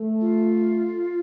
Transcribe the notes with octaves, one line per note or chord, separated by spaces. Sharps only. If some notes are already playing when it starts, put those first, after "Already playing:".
Already playing: A3
F4